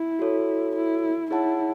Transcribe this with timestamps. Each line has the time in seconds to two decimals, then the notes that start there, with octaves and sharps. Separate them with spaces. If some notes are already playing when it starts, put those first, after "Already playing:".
Already playing: E4
0.19 F#4 A4 C#5
0.76 E4
1.31 D#4 E4 G#4 C#5 F#5 A5